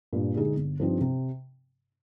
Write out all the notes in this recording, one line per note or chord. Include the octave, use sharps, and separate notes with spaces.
G2 A#2
D3 G#3 D#4 G#4
G1
G2 F3 C4 D#4
C3